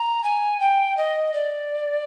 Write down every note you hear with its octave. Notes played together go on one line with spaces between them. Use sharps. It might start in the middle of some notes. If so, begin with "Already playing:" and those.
Already playing: A#5
G#5
G5
D#5
D5